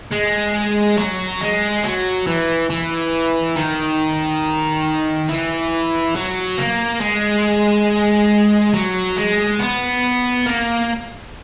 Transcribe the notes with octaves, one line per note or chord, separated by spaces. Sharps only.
G#3
F#3
G#3
F#3
E3
E3
D#3
E3
F#3
A#3
G#3
F#3
G#3
B3
A#3